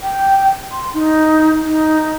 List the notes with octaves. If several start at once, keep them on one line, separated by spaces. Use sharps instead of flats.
G5
C6
D#4
D#4